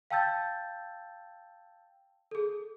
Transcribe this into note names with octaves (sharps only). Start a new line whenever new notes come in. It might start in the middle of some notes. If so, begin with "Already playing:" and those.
F5 G5 A5 E6 G6 A6
G#4 A4